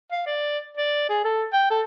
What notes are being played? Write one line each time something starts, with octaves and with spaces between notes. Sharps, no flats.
F5
D5
D5
G#4
A4
G5
A4